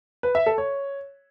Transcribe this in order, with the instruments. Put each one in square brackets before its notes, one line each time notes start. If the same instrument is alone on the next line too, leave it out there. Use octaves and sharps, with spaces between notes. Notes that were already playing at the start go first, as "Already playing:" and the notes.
[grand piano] B4
E5
A4
C#5